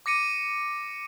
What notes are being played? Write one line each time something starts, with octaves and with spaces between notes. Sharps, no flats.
D6 A#6 C#7 D#7